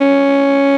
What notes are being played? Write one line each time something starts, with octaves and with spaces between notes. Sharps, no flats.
C#4